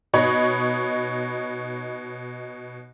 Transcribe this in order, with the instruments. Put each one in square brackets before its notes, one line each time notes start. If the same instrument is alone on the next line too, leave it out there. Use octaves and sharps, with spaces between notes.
[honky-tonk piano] B2 D#4 C#5 D#5 B5